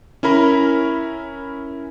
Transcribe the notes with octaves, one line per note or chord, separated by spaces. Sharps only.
C#4 E4 A#4 B5